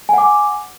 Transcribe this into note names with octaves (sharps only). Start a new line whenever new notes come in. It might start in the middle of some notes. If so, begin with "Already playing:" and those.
F#5 G#5 D6